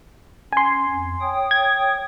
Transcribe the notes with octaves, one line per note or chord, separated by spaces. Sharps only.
C#4 G#5 C6
F2
C#5 G5 D#6
G#6